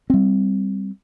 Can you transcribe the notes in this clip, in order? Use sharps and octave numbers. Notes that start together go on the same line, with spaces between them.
G3 C4